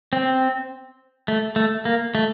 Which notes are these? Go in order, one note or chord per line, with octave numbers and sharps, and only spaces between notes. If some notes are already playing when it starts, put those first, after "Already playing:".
C4
A3
A3
A#3
A3